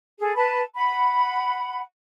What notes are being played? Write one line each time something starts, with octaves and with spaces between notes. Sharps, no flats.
G#4 A4
B4 A5 B5
F#5 B5